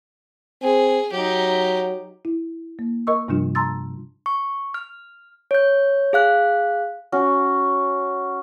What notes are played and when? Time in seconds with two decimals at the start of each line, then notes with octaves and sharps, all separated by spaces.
0.63 C4 G#4
1.12 F#3 D#4 G4
2.25 E4
2.79 A#3
3.07 A#4 D#5 C#6 E6
3.28 G2 C3 F3 G3 D4 F4
3.55 A5 A#5 C6 E6 A6
4.26 C#6
4.74 F6
5.51 C#5 G6
6.13 G#4 F5 F#6
7.12 C#4 F#4